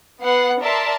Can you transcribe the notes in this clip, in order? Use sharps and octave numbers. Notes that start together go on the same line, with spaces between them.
B3 F#5 C7
A#4 D5 E5 A5 C6